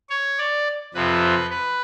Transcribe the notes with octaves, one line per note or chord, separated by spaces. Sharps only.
C#5
D5
F2 C3 F3 B4
B4